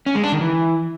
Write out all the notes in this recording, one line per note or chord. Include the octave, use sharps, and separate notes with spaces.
C#4
G#3
D4
D#3
E3